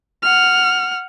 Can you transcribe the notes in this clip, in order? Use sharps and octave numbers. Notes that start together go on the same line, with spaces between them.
F#5 F6